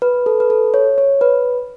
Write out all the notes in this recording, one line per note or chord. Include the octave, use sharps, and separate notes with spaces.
B4
A4
B4
A4
C#5
C#5
B4